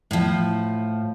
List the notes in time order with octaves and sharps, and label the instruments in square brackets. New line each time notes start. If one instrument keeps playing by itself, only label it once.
[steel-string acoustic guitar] A2 F3